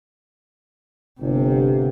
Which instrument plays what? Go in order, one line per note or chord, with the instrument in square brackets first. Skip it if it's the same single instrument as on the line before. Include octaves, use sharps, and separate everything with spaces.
[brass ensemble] G1 [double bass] C3